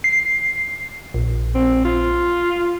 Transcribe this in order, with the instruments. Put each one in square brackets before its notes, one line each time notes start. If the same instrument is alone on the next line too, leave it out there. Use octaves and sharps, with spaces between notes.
[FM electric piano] C7
A#1
[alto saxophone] C4
F4